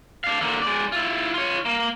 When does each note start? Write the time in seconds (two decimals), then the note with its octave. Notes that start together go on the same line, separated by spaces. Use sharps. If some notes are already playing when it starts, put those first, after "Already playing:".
0.24 D4 F5
0.41 D3 A#3
0.62 G#3 D5
0.92 E4 F4
1.34 F4 C#5
1.65 A#3